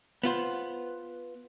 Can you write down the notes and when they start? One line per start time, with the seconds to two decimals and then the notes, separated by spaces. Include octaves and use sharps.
0.24 B3 F4 C5